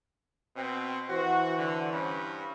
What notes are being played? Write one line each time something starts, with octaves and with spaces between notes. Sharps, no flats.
B2 C4
E3 F#4 C5
D3
G2 C#4 B5